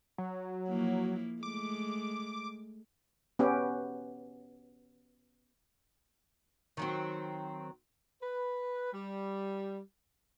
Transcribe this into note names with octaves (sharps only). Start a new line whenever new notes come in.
F#3
F3 A#3 E4
G#3 A3 D6
B3 C#4 G4
D#3 F#3 C4
B4
G3